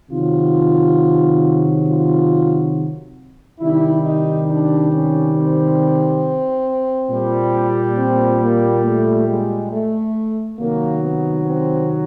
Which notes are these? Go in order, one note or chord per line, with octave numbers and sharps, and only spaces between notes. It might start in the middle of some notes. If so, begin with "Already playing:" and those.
C3 D#3 F#3 F4
F4
C3 D#3 G3 E4
D#4
D4
C#4
C4
A#2 G3
C4
A#3
A3
G#3
A3
C3 D#3 F#3 A#3
B3
C4